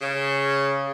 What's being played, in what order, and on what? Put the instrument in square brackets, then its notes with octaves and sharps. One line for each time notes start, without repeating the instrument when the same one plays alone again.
[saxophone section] C#3